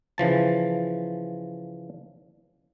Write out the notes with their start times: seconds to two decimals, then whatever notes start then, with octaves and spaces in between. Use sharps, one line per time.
0.18 C#3 E3 F3 A5